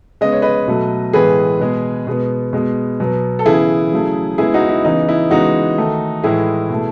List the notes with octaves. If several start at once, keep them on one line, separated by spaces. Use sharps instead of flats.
C#3 G#3 B3 D#5
C#5
B4 D#5
B2 F#3 A3
A2 E3 G#3 B3 G#4 B4
B2 G#3 B3
B2 G#3 B3
B2 G#3 B3
B2 F#3 B3
A4
C#3 E3 B3 E4 G#4
C#3 F#3 A3
C#3 G#3 B3 E4 G#4
D#4 F#4
E4
C#3 E3 B3 D#4
E4
C#3 E3 G#3 B3 D#4 F#4
D#3 A3
A2 E3 G#3 E4 G#4
B2 A3